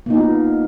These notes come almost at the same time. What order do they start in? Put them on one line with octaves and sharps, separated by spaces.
A#3 D#4 B3 F4